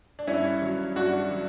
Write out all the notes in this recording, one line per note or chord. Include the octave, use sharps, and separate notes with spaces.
D4
G2 C#4 E4
F#3
G2 D4 F#4
F#3